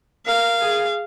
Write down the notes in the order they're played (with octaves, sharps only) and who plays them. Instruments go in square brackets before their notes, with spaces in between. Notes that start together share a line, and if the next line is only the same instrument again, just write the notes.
[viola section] A#4 [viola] F5
[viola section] G#4